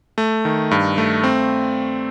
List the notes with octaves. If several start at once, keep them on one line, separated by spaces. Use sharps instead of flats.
A3
D#3
G2
A3
C4